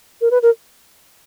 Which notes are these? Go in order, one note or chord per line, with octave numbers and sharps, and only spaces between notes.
A#4
B4
A#4